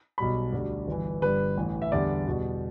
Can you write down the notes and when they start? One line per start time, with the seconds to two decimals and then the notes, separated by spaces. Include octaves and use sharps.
0.18 B1 B2 G3 B5
0.53 D2 D3 G3
0.88 G1 G2 E3
1.22 G1 G2 G3 B4
1.57 A1 A2 E3
1.82 E5
1.92 E2 D3 G3 D5
2.27 E2 B2 G3